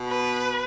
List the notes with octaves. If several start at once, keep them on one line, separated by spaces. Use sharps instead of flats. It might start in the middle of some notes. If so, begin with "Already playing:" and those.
Already playing: B2
B4